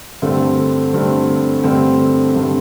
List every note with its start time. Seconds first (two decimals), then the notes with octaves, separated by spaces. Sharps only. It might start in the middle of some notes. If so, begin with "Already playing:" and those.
0.22 G2 D3 A3 C4
0.93 G2 D3 A3 C4
1.64 G2 D3 A3 C4
2.35 G2 D3 A3 C4